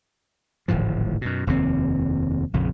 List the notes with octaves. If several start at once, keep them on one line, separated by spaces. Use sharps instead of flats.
D1 G#1 A2 F3
F#2 B2
F1 D#2 C#3 C4
A#1 F2 C#3